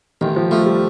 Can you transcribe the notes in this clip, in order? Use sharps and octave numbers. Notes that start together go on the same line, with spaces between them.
A1 D#3
F3
F3 A3
G3